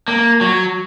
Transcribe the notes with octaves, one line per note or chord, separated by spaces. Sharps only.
A#3
F#3